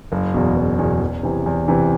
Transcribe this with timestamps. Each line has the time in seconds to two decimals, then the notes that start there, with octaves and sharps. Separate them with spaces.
0.12 F#1
0.34 E2 B2
0.56 F#1
0.79 E2 B2
1.01 E2
1.23 C3 E3
1.46 E2
1.68 C3 E3